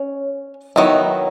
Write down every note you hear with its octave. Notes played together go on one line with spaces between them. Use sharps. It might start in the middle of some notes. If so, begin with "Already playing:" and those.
Already playing: C#4
D#3 F#3 B3 E4